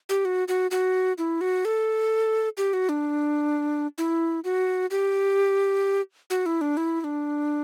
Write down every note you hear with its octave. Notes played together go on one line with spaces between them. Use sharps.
G4
F#4
F#4
F#4
E4
F#4
A4
G4
F#4
D4
E4
F#4
G4
F#4
E4
D4
E4
E4
D4